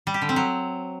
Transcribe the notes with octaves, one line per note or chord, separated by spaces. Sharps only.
G3
G4
D3
C4
F#3